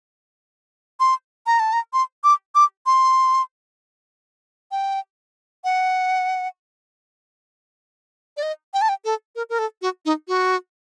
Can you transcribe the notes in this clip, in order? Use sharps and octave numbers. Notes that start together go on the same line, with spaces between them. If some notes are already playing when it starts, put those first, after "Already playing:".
C6
A#5
A5
A#5
C6
D6
D6
C6
G5
F#5
D5
D#5
G5
A5
G5
A4
A#4
A#4
A4
F#4
D#4
F#4